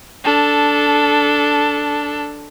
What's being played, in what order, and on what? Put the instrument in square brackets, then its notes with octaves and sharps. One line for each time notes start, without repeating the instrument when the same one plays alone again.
[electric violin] D4 A4